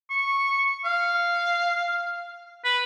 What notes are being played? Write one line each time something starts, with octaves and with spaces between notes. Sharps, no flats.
C#6
F5
B4